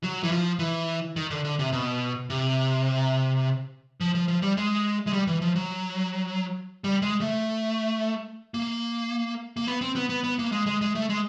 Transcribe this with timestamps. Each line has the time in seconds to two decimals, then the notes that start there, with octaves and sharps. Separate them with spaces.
0.03 F#3
0.23 E3
0.32 F3
0.59 E3
1.16 D#3
1.30 D3
1.45 D3
1.59 C3
1.72 B2
2.30 C3
4.00 F3
4.15 F3
4.28 F3
4.42 G3
4.57 G#3
5.07 G#3
5.13 G3
5.27 E3
5.42 F3
5.56 F#3
6.84 G3
7.02 G#3
7.21 A3
8.54 A#3
9.57 A#3
9.68 B3
9.81 C4
9.96 B3
10.09 B3
10.24 B3
10.39 A#3
10.52 G#3
10.67 G#3
10.81 G#3
10.95 A3
11.09 G#3